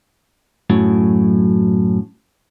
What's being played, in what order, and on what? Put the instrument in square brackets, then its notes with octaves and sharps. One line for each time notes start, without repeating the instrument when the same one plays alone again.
[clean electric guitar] F#2 A2 F#3